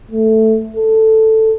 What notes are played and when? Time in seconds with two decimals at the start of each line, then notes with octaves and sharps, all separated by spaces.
0.11 A3
0.77 A4